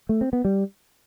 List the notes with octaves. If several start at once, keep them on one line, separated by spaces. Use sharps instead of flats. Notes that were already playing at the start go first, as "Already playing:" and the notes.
A3
C4
B3
G3